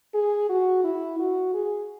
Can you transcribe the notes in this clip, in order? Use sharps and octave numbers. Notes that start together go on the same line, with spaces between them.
G#4
F#4
E4
F#4
G#4